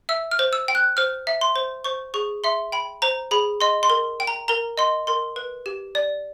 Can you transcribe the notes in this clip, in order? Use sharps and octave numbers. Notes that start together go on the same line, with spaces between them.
E5 E6
F6
C5
E6
G5
F#6
C5 F6
E5
C6
C5
C5 C#6
G#4 C#6
E5 C6
G5 B5
C5 A#5
G#4 B5
D#5 C6
C6
A#4
G5
A#5
A#4 A#5
D#5 C6
A#4 C6
B4
G4
D5